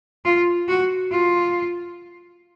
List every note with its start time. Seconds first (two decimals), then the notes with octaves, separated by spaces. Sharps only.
0.25 F4
0.68 F#4
1.12 F4